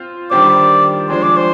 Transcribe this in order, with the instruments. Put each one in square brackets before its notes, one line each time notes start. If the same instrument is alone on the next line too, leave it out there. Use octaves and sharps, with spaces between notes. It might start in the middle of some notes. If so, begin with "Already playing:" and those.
Already playing: [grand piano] C4 F4 C5
[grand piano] D#3 G3 D4 G4 C5 [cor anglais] D5
[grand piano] F3 G#3 D4 G#4 [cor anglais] C5
[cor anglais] D5
C5